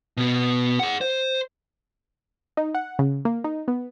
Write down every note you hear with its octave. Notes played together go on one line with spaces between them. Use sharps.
B2 B3
G#4 F#5
C5
D#4
F#5
C#3
A#3
D#4
B3